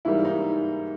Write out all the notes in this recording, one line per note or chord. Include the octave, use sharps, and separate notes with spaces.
G#2 E3 G3 A#3 E4
D#4